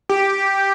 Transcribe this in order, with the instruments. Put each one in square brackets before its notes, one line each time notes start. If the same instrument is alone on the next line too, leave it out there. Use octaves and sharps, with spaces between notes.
[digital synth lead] G4